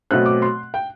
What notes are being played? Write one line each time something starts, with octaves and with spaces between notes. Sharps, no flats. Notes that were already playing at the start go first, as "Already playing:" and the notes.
B2 F#3 A3 C4 F#6
D6
C6
G5